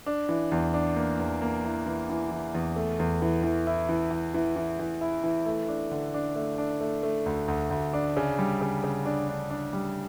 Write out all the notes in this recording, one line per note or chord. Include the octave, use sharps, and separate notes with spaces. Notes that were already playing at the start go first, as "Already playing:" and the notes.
D4
E3
E2
D4
A#3
E2
A#3
E3
E3
E3
E3
E2
A3
E2
E3
E3
E4
E3
E3
E3
E3
E3
E4
E3
A3
D4
D3
D4
A3
D4
A3
A3
D2
D2
D2
D4
C#3
G3
C#3
C#3
D4
D4
D4
G3